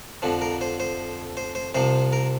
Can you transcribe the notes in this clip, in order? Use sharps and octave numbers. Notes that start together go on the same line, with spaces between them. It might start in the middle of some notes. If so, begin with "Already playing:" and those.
F2 D3 F3
A#4
C5
C5
C5
C5
C2 C3 F3 C5
A#4